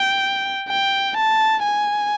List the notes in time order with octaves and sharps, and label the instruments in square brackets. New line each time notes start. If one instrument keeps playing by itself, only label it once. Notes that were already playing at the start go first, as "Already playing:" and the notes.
Already playing: [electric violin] G5
G5
A5
G#5